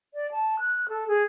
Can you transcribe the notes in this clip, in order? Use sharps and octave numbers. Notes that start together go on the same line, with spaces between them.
D5
A5
F#6
A4
G#4